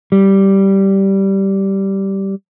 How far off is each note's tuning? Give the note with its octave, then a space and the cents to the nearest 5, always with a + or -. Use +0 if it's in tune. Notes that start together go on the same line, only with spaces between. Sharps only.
G3 -10